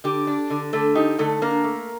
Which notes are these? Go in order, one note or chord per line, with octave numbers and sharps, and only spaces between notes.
D3 G4
D4
D3
D3 A3 A4
D#4 G4
D3 A3 A4
A#3 D4 A#4
A3